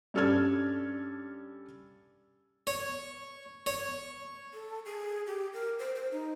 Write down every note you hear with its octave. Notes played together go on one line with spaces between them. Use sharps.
G2 C#4 A4 D5 F6 G#6
C#5
C#5
A4
G#4
G4
A#4
C5
C5
D#4